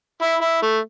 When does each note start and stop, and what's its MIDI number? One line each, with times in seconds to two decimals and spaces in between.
0.22 0.35 64
0.41 0.61 64
0.62 0.79 57